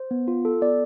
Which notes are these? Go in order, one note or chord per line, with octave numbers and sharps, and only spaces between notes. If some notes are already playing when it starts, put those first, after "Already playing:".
Already playing: C5
B3
F4
A4
B3 D5